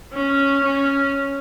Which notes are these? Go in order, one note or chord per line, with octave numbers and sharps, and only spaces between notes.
C#4
C#4